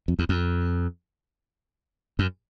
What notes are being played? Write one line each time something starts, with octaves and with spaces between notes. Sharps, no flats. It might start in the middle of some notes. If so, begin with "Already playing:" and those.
F2
E2
F2
F#2